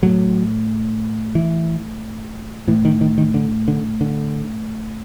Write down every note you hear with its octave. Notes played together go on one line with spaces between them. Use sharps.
A2 F#3
E3
A2 E3
D#3
D#3
D#3
D3
D3
D3